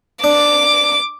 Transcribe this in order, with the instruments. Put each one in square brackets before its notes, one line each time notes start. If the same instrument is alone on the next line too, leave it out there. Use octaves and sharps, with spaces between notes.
[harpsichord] D4 [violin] D6